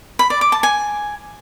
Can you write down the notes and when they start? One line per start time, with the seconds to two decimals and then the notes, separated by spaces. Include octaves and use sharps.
0.19 B5
0.30 D5
0.41 D6
0.52 A5
0.63 G#5